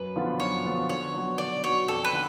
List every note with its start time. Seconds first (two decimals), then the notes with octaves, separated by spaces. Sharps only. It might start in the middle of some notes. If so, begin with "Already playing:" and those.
Already playing: F#2 B4
0.16 D3 F3 B3 F4
0.40 F#2 C#5
0.65 D3 F3 B3 F4
0.89 D3 C#5
1.14 F#3 B3 F#4
1.38 D3 D5
1.64 F#3 B3 F#4 C#5
1.88 F2 A4
2.05 B4
2.13 D3